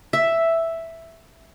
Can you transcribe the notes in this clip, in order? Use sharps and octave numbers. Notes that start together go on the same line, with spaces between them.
E5